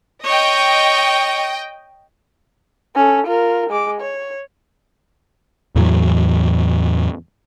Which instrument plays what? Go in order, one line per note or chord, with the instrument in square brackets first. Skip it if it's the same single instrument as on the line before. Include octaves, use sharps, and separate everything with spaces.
[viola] C#5 [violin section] D#5 G5
[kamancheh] C#4 A4
F4 A#4
G#3 D6
C#5
[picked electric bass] E2 A2 E3 F#3